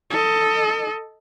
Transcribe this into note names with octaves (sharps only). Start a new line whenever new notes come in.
A4 D#5